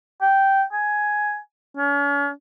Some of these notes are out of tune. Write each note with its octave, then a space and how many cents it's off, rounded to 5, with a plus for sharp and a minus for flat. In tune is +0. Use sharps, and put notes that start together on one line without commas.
G5 -10
G#5 +10
C#4 +40